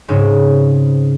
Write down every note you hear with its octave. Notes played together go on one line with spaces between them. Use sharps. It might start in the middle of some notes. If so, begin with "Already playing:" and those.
G#2 C#3 G#3 C4 C#4 D#4